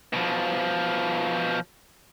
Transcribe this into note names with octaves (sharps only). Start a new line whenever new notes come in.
B2 F3